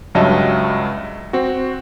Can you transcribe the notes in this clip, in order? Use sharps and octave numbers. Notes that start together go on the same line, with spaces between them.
C#2 G2 F#3 D#5 E5 A5
C4 F#4